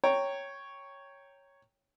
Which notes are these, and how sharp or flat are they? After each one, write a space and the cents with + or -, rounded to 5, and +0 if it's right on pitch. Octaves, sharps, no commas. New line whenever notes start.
C#5 +0 G5 +0 A#5 -15